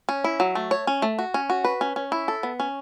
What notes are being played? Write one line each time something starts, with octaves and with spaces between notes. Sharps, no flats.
C#4
E4
F#3
A3
C#5
C#4
A3
F#4
C#4
F#4
B4
C#4
C#4
E4
A4
B3
C#4